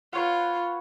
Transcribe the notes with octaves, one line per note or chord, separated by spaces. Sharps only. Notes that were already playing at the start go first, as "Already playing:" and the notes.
F4 B4 C#5 F#5